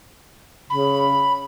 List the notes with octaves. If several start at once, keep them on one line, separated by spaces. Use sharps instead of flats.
C#3 B5